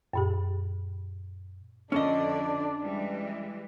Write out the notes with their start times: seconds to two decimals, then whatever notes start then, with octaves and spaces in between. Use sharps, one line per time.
0.13 F#2 A#2 G4
1.92 F2 D3 C#4 D4 A4 D5 D#5
2.84 E3 G3 G#3